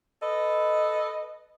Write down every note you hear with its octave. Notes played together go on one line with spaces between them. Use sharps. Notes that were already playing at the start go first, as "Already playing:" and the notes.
A4 B4 D#5